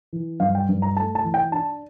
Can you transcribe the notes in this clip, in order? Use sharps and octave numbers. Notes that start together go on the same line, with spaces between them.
E3
G2 F5
G5
G2
A#5
A3 A5
A5
E3
G5
D4 A5